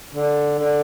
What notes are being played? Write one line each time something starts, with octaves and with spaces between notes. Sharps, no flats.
D3
D3